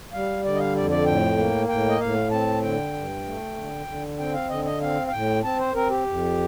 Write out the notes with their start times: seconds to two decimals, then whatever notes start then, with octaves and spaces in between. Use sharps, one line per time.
0.13 G3 F5
0.44 D3 D5
0.55 D#5
0.60 F5
0.75 F2 D5
0.90 D5
1.06 A2 G5
1.37 A#3
1.69 A2 G5
1.89 D#5
2.00 A2 F5
2.31 C4 A5
2.62 D3 G5
2.93 G2
3.24 A3
3.56 D3
3.87 D3
4.18 C4 G5
4.33 F5
4.49 D3 D#5
4.65 D#5
4.81 C4 F5
5.07 F5
5.11 A2 G5
5.43 C4 A5
5.59 C5
5.74 C4 A#4
5.90 G4
6.06 F2